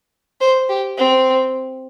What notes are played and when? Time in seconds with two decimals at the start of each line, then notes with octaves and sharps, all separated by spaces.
0.40 C5
0.69 G4
0.98 C4